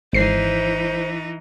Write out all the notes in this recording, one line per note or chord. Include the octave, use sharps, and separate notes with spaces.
G#1 E3 D#4 C5 C7